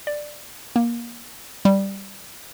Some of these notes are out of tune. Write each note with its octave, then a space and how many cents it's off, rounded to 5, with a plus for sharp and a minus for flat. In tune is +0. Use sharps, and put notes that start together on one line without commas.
D5 +10
A#3 +20
G3 +0